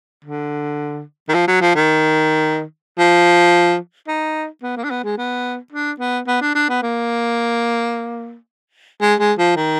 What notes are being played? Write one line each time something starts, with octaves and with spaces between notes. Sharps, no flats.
D3
D#3
F3
F#3
F3
D#3
F3
D#4
B3
A#3
D4
B3
G#3
B3
D4
B3
B3
D4
D4
B3
A#3
G#3
G#3
F3
D#3